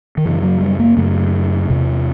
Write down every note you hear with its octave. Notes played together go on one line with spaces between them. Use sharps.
D#3
F#2 C#3 E3
F#3
G3
A#3
F#2 C#3 A3
E2 C3